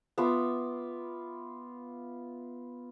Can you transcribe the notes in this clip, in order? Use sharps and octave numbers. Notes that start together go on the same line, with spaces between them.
B3 F4 E5 D6